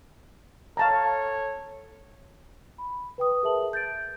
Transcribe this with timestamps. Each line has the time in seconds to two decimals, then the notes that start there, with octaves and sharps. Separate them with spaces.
0.77 A4 C#5 F5 A5 A#5
2.78 B5
3.18 B4 G5 D#6
3.43 G#4 A#4 B4 E5 A5 F#7
3.73 G6 A6 D7